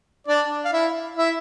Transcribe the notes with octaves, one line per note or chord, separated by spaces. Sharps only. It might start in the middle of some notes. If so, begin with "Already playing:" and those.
D4 D5
F5
E4 E5
E4 E5